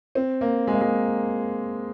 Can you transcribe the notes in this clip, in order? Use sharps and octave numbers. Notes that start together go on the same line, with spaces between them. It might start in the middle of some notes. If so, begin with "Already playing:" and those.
C4
A#3
G#3
A#3
G#3